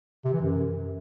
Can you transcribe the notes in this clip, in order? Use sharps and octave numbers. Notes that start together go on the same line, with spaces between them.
C3
E3
F#2